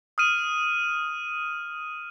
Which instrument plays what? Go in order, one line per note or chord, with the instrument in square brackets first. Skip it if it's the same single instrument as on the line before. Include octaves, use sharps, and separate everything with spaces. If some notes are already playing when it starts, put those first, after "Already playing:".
[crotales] D#6 F6 D#7